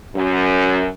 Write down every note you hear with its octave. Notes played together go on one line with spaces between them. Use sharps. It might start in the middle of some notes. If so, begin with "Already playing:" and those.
F#2